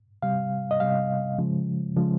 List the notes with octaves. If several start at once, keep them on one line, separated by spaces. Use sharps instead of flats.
C3 G3 F5
D#5
C3 G3 F5
C#3 F3 G#3
C#3 F3 G#3